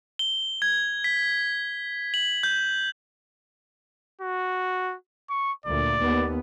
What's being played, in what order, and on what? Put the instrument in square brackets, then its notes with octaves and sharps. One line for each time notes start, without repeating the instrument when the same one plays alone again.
[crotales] G7
G#6
B6
F#7
G6
[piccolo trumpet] F#4
C#6
[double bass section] D2 A#2 [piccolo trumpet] D5
[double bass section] D#2 B3